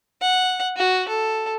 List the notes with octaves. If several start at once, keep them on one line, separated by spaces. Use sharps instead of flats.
F#5
F#4
A4